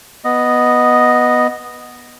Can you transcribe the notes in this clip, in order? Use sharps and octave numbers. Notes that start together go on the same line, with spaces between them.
B3 D#5